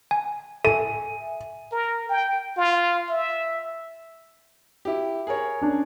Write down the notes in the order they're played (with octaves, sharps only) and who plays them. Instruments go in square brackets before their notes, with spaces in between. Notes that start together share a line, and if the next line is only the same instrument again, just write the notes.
[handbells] G#5
[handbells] A4 [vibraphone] E5 G#5 [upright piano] D#7
[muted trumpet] A#4
G5
F4
E5
[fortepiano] E4 G4
G#4 A#4 C#5
[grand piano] C#4 D4